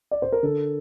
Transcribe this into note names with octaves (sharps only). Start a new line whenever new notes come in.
D5
C5
A#4
D3 A4